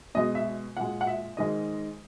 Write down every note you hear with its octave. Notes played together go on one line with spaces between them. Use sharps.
B2 G#3 D#5
E5
A#2 G#3 F#5
F#5
E5
G#2 D#3 G#3 D#5